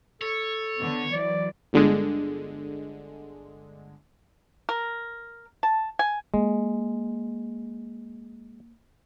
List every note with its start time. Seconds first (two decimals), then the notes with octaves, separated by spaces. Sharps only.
0.21 A4 C#5
0.78 D3 B3
1.12 E3 F#3 D5
1.73 G1 D3 G#3
4.69 A#4
5.63 A5
5.99 G#5
6.34 G#3 A#3